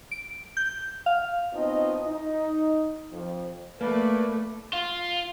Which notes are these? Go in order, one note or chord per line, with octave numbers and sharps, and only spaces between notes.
D7
G6
F5
B2 C4 D#4 F4 D#5
D#4
F2 F3
A3 A#3 B4 D5
F4